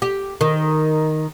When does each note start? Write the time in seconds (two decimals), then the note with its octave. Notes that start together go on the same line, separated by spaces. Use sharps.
0.02 G4
0.41 D#3